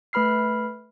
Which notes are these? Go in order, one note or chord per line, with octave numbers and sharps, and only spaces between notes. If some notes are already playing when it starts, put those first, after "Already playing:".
A3 B4 B5 F6 C7